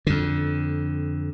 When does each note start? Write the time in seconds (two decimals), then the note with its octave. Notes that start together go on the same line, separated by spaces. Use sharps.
0.07 F2 D3